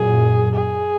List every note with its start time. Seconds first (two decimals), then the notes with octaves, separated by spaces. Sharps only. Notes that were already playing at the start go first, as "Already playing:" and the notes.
Already playing: F#2 A#2 G#4
0.55 G#4